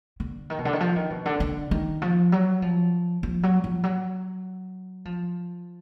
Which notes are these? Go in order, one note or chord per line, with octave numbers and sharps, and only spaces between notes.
D3
D#3
B2
D3
D#3
F3
D#3
B2
D3
D3
D#3
F3
F#3
F3
F3
F#3
F3
F#3
F3